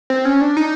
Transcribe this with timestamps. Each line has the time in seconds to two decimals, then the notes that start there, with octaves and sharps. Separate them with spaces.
0.10 C4
0.25 C#4
0.41 D4
0.57 D#4